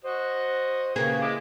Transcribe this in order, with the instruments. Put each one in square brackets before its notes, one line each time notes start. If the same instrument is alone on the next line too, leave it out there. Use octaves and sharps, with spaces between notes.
[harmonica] F#4 D#5 [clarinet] C5
[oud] C#3 A#3 G#4 [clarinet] B4
[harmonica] G#3 E4 [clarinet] D6